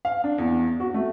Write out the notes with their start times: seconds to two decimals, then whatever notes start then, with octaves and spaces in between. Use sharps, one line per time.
0.05 F5
0.24 D4
0.38 E2
0.80 F#4
0.94 A3